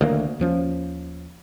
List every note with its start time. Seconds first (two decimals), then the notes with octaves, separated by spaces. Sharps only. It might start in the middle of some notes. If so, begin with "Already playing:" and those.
0.01 D2 D#3 A#3
0.40 D#2 F3 C#4